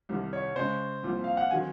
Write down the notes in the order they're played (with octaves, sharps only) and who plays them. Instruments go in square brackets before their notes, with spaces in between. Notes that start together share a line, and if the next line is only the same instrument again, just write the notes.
[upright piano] C2 C3 D#3
[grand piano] C#5
[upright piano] C#3 G#3 C#4 [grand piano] C5
[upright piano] C2 A#2 F3 C4 F4
[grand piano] F5
F#5
[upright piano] D#3 F#3 C4 [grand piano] G#5